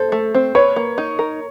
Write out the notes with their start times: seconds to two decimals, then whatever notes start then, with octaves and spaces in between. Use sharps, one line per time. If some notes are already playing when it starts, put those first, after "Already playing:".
Already playing: A4 C5
0.12 A3
0.34 C4
0.55 B4 C#5
0.76 A#3
0.98 D#4
1.19 A#4